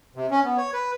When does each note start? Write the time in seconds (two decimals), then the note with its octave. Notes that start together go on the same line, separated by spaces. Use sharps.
0.15 C3
0.31 C#4
0.44 B3
0.57 C#5
0.73 B4